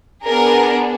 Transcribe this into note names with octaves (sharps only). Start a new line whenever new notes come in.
B3 D4 G#4 A#4